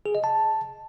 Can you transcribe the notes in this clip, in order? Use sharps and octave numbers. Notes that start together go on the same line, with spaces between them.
G#4
D#5
A5